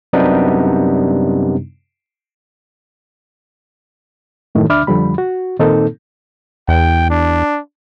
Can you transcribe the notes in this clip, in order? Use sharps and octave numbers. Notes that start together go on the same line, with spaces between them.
F#2 C3 G3 B3 D4 D#4
F#2 A2 D#3 E3
D2 D4 E5 B5 D6 F6
F2 D3 F3 G3 B5
F#4
A#2 D#3 A#3 C4 D#4 A4
E2 G5
D4